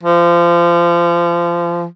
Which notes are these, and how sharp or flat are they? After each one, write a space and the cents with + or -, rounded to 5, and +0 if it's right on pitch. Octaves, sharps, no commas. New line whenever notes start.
F3 -25